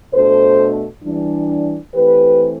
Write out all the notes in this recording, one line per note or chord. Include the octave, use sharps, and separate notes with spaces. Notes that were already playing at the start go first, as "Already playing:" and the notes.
B2 A3 D4 A4 C5
E3 G3 D4
E3 A3 C4 G4 B4